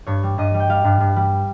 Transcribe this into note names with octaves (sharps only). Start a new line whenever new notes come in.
G2 C#5
G3
G2 D#5
G3
G5
G3 F5
G2
G2
G3